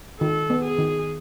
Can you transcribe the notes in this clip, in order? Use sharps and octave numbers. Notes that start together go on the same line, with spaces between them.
D#3 A4
B3
G#4
D#3